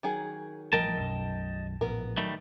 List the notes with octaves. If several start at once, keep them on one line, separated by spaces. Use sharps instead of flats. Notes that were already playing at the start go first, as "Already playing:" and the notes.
D#3 F#3 G#4
A1 F3 G3 A#4 D#5 G5 A5
B1 F#2 B2
A#1 A2 B3 A#4
D#3 F#3 G3 A3